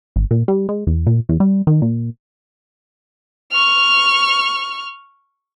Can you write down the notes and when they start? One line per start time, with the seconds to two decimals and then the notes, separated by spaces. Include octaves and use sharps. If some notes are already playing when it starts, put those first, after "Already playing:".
0.16 G#1
0.31 A#2
0.48 G3
0.69 G#3
0.87 E2
1.07 A#2
1.29 E2
1.40 G3
1.67 D#3
1.82 A#2
3.51 C#6 F6